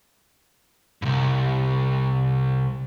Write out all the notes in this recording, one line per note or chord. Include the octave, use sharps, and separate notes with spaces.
C2 G2